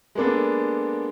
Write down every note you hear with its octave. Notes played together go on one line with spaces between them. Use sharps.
G#3 A#3 B3 D4 A4